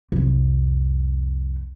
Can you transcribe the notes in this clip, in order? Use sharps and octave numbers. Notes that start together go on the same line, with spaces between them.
C2 F2